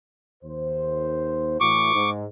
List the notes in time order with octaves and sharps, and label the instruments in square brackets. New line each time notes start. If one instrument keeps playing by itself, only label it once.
[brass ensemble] D#2 C5
[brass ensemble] A2 E3 F#4 [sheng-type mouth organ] C#6 D6
[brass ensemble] G#2